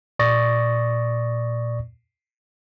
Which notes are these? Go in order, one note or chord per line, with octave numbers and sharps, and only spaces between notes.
A#2 D5 C#6 D#6 A6 A#6